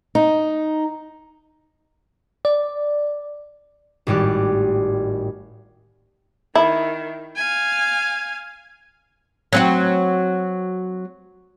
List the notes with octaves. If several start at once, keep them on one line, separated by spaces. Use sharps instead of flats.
D#4
D5
G#1 A2 G3 D5 F#6
D#3 E4
F5 G#5
F#3 C4 F#4